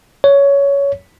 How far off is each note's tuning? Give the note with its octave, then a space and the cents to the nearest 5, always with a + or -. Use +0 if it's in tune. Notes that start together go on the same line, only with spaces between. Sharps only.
C#5 +15